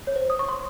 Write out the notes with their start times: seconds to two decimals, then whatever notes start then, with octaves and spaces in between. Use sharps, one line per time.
0.07 C#5
0.16 C5
0.30 D#6
0.39 C#6
0.48 C6